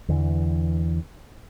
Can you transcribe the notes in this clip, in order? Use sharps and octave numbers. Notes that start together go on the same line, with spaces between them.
E2 D3 E3